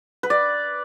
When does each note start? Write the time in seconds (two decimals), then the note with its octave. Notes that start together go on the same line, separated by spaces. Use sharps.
0.23 B4
0.30 D5